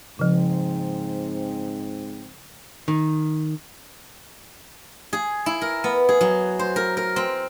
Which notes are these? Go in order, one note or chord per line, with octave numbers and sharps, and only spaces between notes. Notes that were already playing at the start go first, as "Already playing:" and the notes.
G#2 C#3 F3 C4
D#3
G#4
E4
A#4
B3
G#4
F#3
C5
A#4
A#4
C4